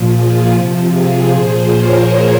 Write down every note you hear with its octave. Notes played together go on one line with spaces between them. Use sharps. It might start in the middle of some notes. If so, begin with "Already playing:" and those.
Already playing: A#2 F3
F4 G#4
C3 F3
F4 G#4
A#2 F3 G#4 C5
A#4 C#5